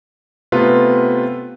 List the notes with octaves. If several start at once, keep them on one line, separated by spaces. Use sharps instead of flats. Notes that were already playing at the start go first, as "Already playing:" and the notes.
C3 A3 B3 F4 B4